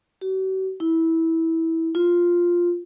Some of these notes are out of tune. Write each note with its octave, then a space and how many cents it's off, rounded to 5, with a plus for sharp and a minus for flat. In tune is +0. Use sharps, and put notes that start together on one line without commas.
F#4 +45
E4 -15
F4 +0